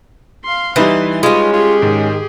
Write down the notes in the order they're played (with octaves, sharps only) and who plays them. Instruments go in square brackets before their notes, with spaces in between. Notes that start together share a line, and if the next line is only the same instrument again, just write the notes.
[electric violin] F5 C6
[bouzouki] E3 [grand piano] G3 D#4 B4 [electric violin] C6
[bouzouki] G#3 C#4 [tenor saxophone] F4 [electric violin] G4
[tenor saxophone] F4 [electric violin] G4 G#4
[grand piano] G#2 [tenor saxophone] D#3